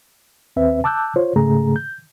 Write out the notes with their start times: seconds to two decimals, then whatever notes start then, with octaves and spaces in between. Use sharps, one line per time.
0.56 D#2 C4 B4 E5
0.84 A5 D6 E6 F#6 G6
1.16 F4 C5 C#5
1.36 G#2 C#3 A3 G#4 A#5
1.76 G6